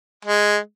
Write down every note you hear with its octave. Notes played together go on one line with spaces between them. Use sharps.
G#3